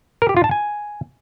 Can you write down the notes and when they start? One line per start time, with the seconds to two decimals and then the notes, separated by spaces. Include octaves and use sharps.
0.22 A#4
0.29 G4
0.37 F4
0.44 A5
0.51 G#5